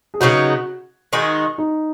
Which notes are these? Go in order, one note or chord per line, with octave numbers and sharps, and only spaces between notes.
G#4
C#3 F#3 B3 D#4 F#4
D#3 G#3 D#4 F#4
D#4